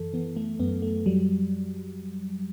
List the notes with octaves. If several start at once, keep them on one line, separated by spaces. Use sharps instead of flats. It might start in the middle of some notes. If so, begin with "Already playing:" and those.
Already playing: F#2 E3 A4
E3 B3
A3
F#2 B3
A3
F#3 G3